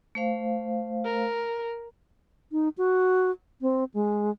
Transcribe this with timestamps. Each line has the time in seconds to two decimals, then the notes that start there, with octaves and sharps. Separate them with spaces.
0.15 A3 C5 F5
1.05 A#4
2.52 D#4
2.78 F#4
3.61 C4
3.94 G#3